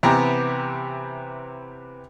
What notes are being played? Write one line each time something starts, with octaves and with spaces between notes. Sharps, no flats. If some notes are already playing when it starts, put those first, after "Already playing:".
C3 E3 B3 G4 A#5